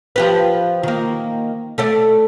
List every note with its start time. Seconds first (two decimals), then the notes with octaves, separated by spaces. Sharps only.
0.16 F3 G4 B4
0.83 D#3 A#3
1.78 A3 A4 D5